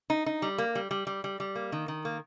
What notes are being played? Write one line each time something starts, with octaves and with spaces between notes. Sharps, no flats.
D#4
D#4
G3
A#3
G3
G3
G3
G3
G3
A#3
D#3
D#3
A#3